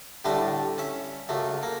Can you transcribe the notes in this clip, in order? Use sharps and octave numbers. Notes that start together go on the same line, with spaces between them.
A2 D3 G3 A3 D4
C#4 E5
C#2 F#2 A3
A#3